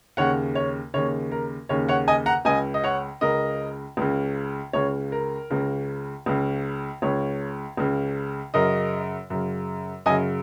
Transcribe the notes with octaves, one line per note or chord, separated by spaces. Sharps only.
D#2 C#3 C#5 F#5
C#5
D#2 C#3 C#5
A#4
D#2 C#3 C#5
C#5 F#5
D#5 G#5
F#5 A#5
C#2 C#3 D#5 G#5
D#5
C#5 F#5
C#2 C#3 A#4 D#5
C#2 C#3
C#2 C#3 C#5
A#4
C#2 C#3
C#2 C#3
C#2 C#3 C#5
C#2 C#3
F#2 C#3 A#4 D#5
F#2 C#3
F#2 C#3 D#5 G#5